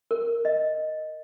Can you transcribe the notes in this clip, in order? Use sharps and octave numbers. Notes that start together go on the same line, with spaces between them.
A#4
D#5